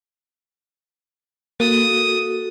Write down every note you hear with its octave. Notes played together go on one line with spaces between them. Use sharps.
A#3 F#4 A4 D#6